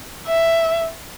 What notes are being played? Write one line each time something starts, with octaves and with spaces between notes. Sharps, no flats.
E5